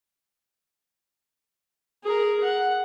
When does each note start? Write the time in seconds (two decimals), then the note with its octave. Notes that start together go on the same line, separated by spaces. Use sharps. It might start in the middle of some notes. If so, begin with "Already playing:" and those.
2.03 G#4 A#4
2.43 F#5